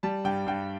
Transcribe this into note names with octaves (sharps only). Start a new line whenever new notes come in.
G3 A5
G2 G5
G2 G5